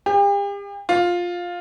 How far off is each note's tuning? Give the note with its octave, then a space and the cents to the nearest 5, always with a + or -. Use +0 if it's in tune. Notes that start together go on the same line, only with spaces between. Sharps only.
G4 +40
F4 +10